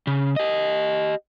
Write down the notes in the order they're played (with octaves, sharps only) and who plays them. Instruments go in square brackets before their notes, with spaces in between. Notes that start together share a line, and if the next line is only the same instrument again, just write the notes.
[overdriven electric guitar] C#3
G4 D#5